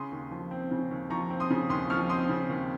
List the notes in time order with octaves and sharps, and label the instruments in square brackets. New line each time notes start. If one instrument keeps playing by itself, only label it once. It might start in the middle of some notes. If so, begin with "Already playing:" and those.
Already playing: [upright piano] C#3 C6 D#6
D#2
F3
C4
C#3
D#2
F3 A#5 C#6
C4
C6 D#6
C#3
D#2 C6 D#6
F3 C#6 F6
C4 C6 D#6
C#3
D#2